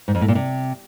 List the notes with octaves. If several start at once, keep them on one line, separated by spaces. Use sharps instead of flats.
G#2
F2
A2
A#2
C3